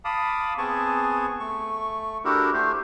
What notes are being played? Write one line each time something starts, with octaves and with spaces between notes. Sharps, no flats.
F5 A5 B5 D6 D#6
B3 C4 G#4 G#5 A5 C#6
A3 C#6
D4 E4 F#4 G4 A4 A#4
A3 G4 C5